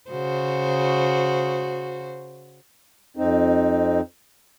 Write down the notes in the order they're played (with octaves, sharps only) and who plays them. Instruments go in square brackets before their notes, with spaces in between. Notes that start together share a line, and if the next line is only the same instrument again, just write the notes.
[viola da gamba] C#3 F#4 C5
[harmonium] F2 C4 D#4